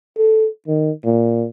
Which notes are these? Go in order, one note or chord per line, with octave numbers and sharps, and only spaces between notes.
A4
D#3
A#2